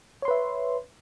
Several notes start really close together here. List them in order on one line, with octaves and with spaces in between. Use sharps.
C#5 C6 B4 E5